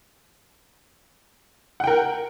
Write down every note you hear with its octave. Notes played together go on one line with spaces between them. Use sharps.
A#4 F#5 G5